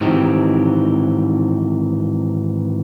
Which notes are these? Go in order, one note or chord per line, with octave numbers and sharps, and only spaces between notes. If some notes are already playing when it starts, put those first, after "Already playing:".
G#2 D#3 E3 F#3 C4 G4